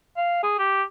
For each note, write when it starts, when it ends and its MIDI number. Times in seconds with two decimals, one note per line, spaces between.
0.17 0.42 77
0.43 0.54 68
0.58 0.83 67